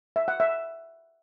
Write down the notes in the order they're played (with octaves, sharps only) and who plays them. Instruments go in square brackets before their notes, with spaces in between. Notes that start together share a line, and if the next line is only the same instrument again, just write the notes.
[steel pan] E5
F#5
E5